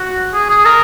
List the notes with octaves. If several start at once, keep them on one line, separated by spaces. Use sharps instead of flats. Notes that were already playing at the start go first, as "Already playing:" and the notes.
Already playing: F#4
G#4
G#4
A#4